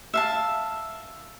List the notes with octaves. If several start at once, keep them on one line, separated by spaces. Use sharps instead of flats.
E5 F5 A5